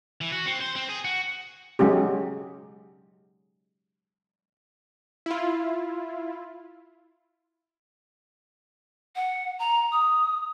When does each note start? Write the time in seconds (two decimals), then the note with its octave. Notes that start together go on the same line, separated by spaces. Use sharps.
0.21 E3
0.32 F#4
0.47 C4
0.61 C5
0.76 C4
0.89 G#4
1.05 F#4
1.79 F#3 G#3 C#4 G4
5.26 E4 F4
9.16 F#5
9.59 A#5
9.92 D#6